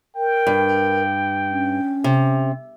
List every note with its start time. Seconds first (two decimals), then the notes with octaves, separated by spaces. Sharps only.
0.16 A#4 G5
0.47 G2
1.51 C#4
2.04 C3